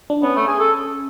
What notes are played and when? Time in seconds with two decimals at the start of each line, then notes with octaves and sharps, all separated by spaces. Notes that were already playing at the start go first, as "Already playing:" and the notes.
0.10 D4
0.23 B3 C#4
0.36 A3
0.48 G#4
0.60 A4